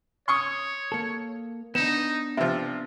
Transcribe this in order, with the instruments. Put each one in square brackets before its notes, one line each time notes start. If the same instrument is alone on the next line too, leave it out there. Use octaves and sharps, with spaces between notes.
[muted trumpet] C#5 [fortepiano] C6 C#6 D#6
[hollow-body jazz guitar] A#3 A4
[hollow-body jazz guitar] B3 D4 [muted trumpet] D#4 [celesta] E7
[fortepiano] C3 F3 [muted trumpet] D5 [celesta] E5